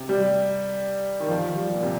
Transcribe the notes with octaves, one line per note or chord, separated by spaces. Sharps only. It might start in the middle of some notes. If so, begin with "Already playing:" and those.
Already playing: C3
G3
D#3
F3
G3
A#2
C3